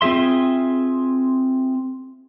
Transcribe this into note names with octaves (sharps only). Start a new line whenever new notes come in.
C4 F4 G#4 E5 C6